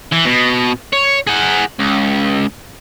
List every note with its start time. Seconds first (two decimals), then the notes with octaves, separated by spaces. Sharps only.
0.13 E3
0.26 B2
0.93 C#5
1.27 G#4 F#5
1.79 C#2